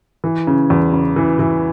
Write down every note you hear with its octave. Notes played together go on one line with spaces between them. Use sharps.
E3
C#3
E2
C#3
E3
E3